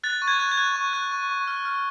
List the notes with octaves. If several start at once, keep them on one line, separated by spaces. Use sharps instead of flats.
F#6 A6
C#6
G#6
F#6
G#6
F#6
C#6
F#6
C#6
C#6
F6
F6